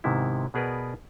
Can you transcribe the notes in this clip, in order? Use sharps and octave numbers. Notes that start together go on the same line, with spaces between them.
G#2 C3 D#3 B3 E4
B2 B3 G#4 A#4 B4 D5